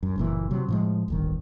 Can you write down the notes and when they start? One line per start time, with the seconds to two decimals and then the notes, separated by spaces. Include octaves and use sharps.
0.03 F#2
0.18 F#1 A#2 E3
0.51 C3 F#3
0.68 A2 F3 G#3
1.08 D1 G1 D#3